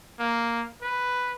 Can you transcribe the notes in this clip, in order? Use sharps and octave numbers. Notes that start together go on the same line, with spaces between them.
A#3
B4